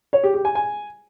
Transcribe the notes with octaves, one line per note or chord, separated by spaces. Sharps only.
C#5
G4
G4
G#5
G#5